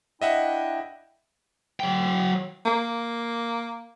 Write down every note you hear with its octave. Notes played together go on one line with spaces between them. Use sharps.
D4 E4 D#5 E5 F#5 G5
F#3 G5
A#3